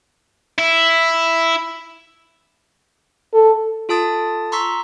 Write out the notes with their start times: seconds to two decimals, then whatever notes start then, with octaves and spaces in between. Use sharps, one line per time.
0.59 E4
3.34 A4
3.89 F4 A4 A5 D#6 A6
4.52 A#5 C6 C#6 E6 B6